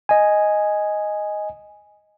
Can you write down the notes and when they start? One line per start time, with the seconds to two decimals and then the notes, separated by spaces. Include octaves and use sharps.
0.09 D#5 G#5